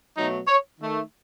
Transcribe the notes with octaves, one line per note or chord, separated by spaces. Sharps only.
B2 F#3 A3 D#4
C#5
D#3 A3